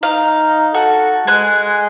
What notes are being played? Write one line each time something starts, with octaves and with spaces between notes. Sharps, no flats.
D#4 F5
F#4 A4
G#3 G#5 F#6